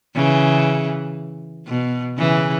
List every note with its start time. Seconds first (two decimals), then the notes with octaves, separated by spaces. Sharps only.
0.15 C#3 E3
1.67 B2
2.17 C#3 E3